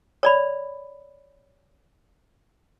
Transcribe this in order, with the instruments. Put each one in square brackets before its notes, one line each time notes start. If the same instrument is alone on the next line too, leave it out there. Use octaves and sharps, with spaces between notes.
[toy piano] C#5 D5 B5